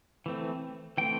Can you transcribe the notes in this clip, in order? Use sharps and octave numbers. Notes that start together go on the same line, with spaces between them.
E3 A3 C4
E3 A3 C4 G5